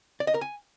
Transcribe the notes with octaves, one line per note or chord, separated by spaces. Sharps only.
D5
D#5
A#4
G#5